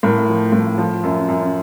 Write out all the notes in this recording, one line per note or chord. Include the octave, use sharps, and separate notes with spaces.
A2 A#4
F3
A2
F3
F#2
F#2